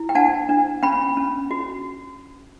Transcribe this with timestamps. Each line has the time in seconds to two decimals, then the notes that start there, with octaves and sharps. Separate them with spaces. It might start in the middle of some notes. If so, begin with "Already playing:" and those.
Already playing: E4
0.09 G5
0.15 D4 F#5 A5
0.49 D4
0.83 C#4 G5 B5
1.17 C#4
1.51 F#4